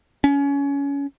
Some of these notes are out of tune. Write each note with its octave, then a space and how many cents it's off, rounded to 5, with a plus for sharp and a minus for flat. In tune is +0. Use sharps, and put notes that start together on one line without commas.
C#4 +25